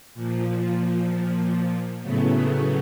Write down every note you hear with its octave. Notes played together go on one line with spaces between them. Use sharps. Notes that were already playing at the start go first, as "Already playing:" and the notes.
A#2 F3
A2 C#3 F#3 A3 B3